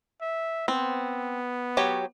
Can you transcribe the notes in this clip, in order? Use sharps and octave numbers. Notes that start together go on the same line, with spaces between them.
E5
B3 C4
F#3 G4 C#5